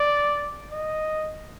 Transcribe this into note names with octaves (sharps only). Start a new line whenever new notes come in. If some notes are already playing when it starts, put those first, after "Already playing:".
Already playing: D5
D#5